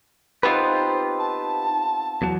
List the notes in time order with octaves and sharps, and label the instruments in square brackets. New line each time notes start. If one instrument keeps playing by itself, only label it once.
[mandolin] B3 C4 F4 [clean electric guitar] D#4 G4 B4 [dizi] C5
[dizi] A5
[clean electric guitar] E2 F#3